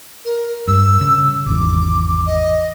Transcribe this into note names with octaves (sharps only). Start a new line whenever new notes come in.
A#4
G2 E6
C#3
G#1 E2 D6
D#5